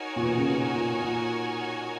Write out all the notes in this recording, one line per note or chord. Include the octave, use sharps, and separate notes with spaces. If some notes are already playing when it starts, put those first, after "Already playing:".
Already playing: D#4 F#4 A#4 C#5 G#5
A#2
B2
C#3
B2
A#2
A#2